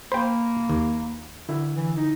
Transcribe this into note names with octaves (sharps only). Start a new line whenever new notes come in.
A#3 C5 G5 B5
D#2
D3 E4
E3
D#4